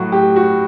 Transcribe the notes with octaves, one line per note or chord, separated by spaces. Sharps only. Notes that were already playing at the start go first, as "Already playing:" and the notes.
Already playing: A2 F#3 F#4
G4
F#4